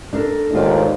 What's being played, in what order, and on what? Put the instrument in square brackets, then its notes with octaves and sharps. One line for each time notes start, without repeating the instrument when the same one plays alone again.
[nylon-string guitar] D4 A4 A#4
[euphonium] D#2 [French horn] G#2 [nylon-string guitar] D4 F4 D5